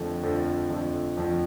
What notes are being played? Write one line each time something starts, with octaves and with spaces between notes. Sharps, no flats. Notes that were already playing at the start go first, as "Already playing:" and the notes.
Already playing: F2 D3 F3 A3
F2 D3 F3 A3
F2 D3 F3 A3
F2 D3 F3 A3